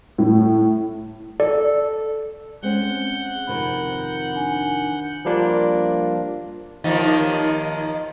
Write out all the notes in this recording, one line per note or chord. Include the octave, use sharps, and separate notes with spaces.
A2
A4 D5
G#3 C4 C#4 F#5 G6
F2 C3 D#3 B5
D4 G#5
F3 G3 A#3 D4 F4
D#2 D#3 F3